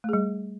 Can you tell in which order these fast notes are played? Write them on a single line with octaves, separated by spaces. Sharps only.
A3 G#4 G3